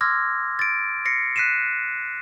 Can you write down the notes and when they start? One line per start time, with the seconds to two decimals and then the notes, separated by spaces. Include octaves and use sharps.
0.01 C6 D6 E6 F6 G#6 A#6
0.59 A6 D7
1.05 A#6 C7 C#7
1.36 F#6 B6 C7 D#7 E7